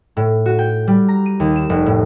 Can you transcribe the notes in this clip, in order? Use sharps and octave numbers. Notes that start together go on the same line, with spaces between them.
A2
F#4
G5
G3
A#5
D#7
D#2
E7
F1
A2